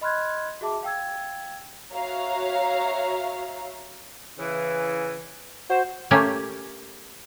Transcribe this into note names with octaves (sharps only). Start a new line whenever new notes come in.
D#5 B5 C6 F6 F#6 G#6
F#4 G#4 E5 A5 D6
F5 G5 E6 G#6
F#4 C#5 E5 F5 A#5
C#3 E3
F#4 C5
A3 A#3 C#4 G4